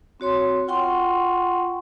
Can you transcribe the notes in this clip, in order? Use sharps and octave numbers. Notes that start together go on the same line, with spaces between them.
C4 F#4 C#5 C6
F4 F#5 G5 C6 C#6